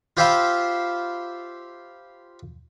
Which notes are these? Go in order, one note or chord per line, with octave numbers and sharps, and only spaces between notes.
F4 G4 C5 E5 F5 B5